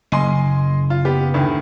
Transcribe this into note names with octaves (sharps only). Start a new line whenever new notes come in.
F#1 D#5 G#5 C6
F4
B3 G4
D2 A2 D#3